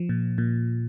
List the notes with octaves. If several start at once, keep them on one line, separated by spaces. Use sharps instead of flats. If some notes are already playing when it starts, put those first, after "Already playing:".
Already playing: F3
A#2
A#2